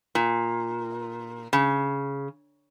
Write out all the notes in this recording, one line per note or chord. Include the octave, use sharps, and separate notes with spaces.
A#2
C#3